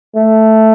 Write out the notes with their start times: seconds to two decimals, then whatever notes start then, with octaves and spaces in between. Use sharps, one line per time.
0.15 A3